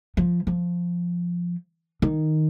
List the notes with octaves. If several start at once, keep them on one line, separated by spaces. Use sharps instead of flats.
F3
F3
D#3